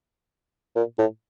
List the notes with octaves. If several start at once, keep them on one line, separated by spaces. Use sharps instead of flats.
A#2
A2